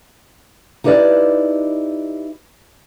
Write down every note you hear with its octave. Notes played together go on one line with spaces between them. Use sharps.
D#4 E4 G4 B4 C#5 D5